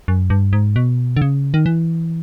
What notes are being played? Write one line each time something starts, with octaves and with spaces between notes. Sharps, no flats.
F#2
G2
G#2
B2
D3
C#3
D#3
E3